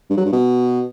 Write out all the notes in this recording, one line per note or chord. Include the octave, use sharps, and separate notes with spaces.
G2
F#3
G2
B2